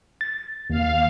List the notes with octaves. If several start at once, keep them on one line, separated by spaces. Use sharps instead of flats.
A6
D#2 F5